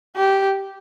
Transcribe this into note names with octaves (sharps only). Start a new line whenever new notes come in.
G4